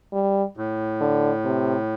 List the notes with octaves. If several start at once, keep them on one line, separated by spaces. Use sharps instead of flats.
G3
A2
D3
C3